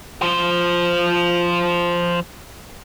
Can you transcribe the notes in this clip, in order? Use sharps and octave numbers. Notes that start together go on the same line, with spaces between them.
F3 C5